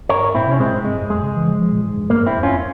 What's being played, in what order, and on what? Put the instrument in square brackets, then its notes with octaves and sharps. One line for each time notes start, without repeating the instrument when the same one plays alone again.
[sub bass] G2 [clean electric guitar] A#4 C#5
[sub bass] G#2
[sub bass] A#2 [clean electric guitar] C4 E4
[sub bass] C3 [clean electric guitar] C#4
[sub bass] A#2 [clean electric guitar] G#3 C4
[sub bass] G#2
[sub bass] G2 [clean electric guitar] G#3
[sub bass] F2
[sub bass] F2 [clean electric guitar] G#3
[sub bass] C#3
E3
F3
F3
A#2
G#2
G2
[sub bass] G2 [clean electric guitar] A#3
[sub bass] G2 [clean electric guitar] C4 E4
[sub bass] E2
[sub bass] F2 [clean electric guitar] C#4 F4